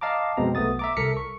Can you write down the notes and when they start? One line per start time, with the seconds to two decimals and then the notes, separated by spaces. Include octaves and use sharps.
0.01 D#5 F5 A5 A#5 D6
0.37 F2 B2 G#3 C4 A#5
0.55 B1 A3 B3 D#6 A6
0.79 E5 A#5 D6
0.97 C2 A4 A#4 A#5 B6 C#7
1.17 C#6